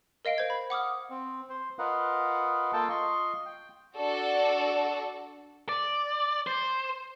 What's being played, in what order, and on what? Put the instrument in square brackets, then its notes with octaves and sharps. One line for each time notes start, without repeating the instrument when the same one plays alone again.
[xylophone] A#4 D#5 F5 D7
C5 G#6
B5
F#5 D6 D#6 F6
[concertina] C4
C5
F4 A#4 B4 D#5 F5 F#5
A#3 F4 A4 G5 A5
F4 D#5 C6 C#6
G5
[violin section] D4 F#4 A4 D5
[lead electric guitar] D5
C5